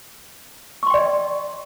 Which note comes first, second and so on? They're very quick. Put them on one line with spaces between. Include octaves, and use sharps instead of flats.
C#6 C6 G5 D5 D#5